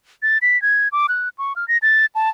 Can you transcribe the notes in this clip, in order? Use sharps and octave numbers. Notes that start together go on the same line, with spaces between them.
A6
B6
G#6
D6
F#6
C#6
F6
A#6
A6
A5